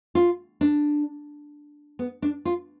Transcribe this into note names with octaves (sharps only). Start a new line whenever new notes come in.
F4
D4
B3
D4
F4